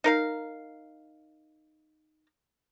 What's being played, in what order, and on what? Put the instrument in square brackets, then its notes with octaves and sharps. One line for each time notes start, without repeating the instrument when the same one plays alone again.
[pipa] D#4 A#4 F5